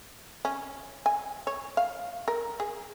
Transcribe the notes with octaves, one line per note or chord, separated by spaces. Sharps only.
C#4
G#5
C#5
F5
A#4
G#4